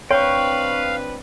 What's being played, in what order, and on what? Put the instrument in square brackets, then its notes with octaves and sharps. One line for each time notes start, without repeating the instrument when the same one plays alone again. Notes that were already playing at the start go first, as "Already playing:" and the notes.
[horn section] C4 D4 B4 [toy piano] C#5 [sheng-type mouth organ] F5 [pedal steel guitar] G5 C#6